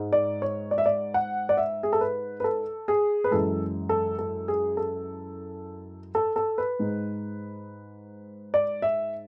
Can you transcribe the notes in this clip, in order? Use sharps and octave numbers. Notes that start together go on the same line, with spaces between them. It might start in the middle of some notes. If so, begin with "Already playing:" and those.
Already playing: G#2 G#3
D5
C#5
D5
E5
D5
F#5
D5
E5
G#4
A4
B4
B4
A4
G#4
B4
F#2 E3 G#3 A4
A4
A4
G#4
A4
A4
A4
B4
G#2 G#3
D5
E5